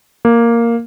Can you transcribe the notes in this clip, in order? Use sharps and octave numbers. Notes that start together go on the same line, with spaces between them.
A#3